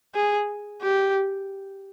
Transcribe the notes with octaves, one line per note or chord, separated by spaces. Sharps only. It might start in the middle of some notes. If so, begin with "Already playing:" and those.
G#4
G4